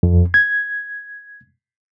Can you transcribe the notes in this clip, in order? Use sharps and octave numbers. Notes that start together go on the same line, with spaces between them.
F2
G#6